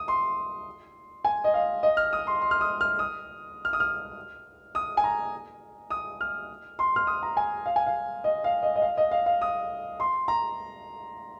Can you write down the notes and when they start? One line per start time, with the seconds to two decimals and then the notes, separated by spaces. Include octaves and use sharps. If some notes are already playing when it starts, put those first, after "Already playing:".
Already playing: D#6
0.08 C6
1.24 G#5
1.44 D#5
1.54 F5
1.83 D#5
1.97 F6
2.13 D#6
2.27 C6
2.42 C6
2.51 F6
2.61 D#6
2.81 F6
2.99 D#6
3.65 F6
3.73 D#6
3.80 F6
4.75 D#6
4.97 G#5
5.04 A#5
5.90 D#6
6.21 F6
6.79 C6
6.96 F6
7.07 D#6
7.23 A#5
7.37 G#5
7.66 F5
7.76 G#5
7.87 F5
8.24 D#5
8.44 F5
8.63 D#5
8.76 D#5
8.82 F5
8.97 D#5
9.11 F5
9.26 F5
9.41 D#6
10.00 C6
10.28 A#5